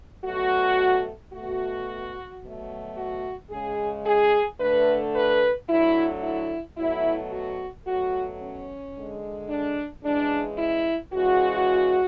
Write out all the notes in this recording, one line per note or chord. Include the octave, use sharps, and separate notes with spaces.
B2 F#3 A3 F#4
B2 A3 F#4
B2 F#3 A3
F#4
C#3 G#3 G#4
G#4
D3 A3 B4
B4
D3 F#3 A3 E4
E4
B2 F#3 A3 E4
F#4
B2 F#3 A3 F#4
C#4
D3 G#3
D4
C#3 E3 G#3 D4
E4
C#3 E3 G#3 F#4